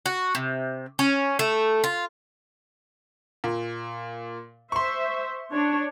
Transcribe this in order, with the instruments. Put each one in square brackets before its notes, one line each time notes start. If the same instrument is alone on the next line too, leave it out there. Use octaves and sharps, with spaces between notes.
[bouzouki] F#4
C3
C#4
A3
F4
[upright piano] A#2
[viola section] C5 E5 [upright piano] C6 C#6
[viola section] D4 C#5